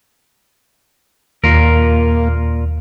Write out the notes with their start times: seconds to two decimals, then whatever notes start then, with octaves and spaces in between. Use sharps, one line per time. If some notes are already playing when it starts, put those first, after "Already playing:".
1.44 D#2 A#2 A#3 F4 A#4